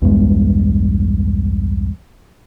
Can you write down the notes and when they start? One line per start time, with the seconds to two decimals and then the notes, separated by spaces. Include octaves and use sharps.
0.02 B1 E2 G2 G#3